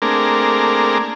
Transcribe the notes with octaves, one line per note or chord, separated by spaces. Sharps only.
A3 A#3 C4 D4 G#4 A#4